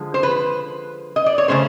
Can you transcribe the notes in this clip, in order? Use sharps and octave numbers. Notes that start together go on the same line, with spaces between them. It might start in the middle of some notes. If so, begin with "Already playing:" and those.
Already playing: D3 F3 G#3
C5
B4
D#5
D5
C#5
C#3 F3 A3 C#4 C5